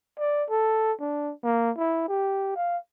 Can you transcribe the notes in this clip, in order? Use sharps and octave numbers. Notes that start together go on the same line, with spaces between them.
D5
A4
D4
A#3
E4
G4
F5